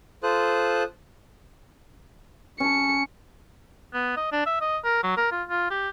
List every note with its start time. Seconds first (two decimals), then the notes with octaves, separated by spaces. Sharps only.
0.23 F4 A4 C5 D#6 F#6
2.60 C#4 A5 C#7
3.93 B3
4.17 D#5
4.32 D4
4.46 E5
4.61 D#5
4.84 A#4
5.03 F#3
5.17 A#4
5.31 F4
5.49 F4
5.70 G4